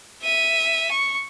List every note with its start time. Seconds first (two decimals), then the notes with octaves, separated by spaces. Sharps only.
0.22 E5 D#7
0.91 C#6